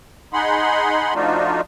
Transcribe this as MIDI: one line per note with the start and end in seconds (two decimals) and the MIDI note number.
0.33 1.14 63
0.33 1.14 68
0.33 1.14 78
0.33 1.14 83
0.33 1.14 84
1.15 1.61 53
1.15 1.61 57
1.15 1.61 62
1.15 1.61 63
1.15 1.61 65
1.15 1.61 66